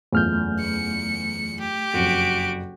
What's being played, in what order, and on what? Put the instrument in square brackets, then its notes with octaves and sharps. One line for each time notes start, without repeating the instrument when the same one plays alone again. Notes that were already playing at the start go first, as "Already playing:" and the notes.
[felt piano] F#1 E2 F4 [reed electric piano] A3 F6 G6
[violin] C#7
G4
[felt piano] F#1 F2 [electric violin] F#4 D7